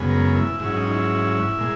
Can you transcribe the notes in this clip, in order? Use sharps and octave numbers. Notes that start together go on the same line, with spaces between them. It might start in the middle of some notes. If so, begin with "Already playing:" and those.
Already playing: F#2 C#3 G#3 B3
A#4
E4
G#2 F#3 C#4 E4
D#4
E4
A#2 G#3